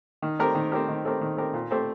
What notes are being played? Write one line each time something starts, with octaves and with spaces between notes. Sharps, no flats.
D#3
A3 C4 G4 A#4
D#3
A3 C4 G4 A#4
D#3
A3 C4 G4 A#4
D#3
A3 C4 G4 A#4
A#2
A3 C4 G4 C5